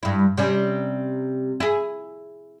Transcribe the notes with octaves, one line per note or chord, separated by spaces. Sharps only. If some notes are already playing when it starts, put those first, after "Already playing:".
G2 E4
C3 G3 C#4
E4 G#4